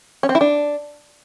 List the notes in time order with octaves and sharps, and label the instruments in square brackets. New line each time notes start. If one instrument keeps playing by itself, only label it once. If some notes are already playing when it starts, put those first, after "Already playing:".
[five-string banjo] C#4
C4
E4
D4